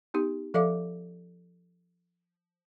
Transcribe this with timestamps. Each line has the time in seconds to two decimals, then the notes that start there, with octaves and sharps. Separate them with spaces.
0.14 B3 D#4 G4
0.54 F3 A4 D5 E5 F5 D6